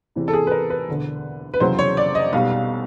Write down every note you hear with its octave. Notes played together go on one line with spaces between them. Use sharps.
E2 C3 E3
A4
G#4
B4
A#4
B4
E1 D2 D3
B4
F1 E2 C#3 F#3 C5
C#5
D5
D#5
B1 B2 G3 F5
F5